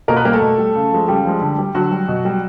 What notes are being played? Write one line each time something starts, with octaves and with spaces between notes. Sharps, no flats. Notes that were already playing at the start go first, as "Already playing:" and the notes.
B2 A#3 A#4
B3 B4
G3 A#3 A#4
A3 A4
B2
G3
C#3
F3 G#3
C#3 G3 G4
F3 G#3
D3
G3
D3 F#3 F#4
G3
B2
G3